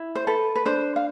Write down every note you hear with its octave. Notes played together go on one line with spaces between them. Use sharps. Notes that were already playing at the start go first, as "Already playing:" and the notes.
Already playing: E4
C5
A4 B4
B4
D4 C5
F5